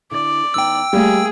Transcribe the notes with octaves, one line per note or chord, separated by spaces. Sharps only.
D3 E4 D5
E2 D#4 G5 E6
G3 A3 A#3 G#4 F5